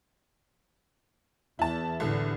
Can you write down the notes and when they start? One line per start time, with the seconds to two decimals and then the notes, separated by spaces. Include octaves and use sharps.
1.59 E2 E4 A5
2.00 C2 A2 D3 E3 A4